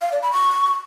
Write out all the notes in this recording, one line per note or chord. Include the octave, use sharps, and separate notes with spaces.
F5
D5
B5
C#6